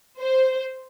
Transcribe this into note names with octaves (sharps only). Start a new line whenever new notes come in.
C5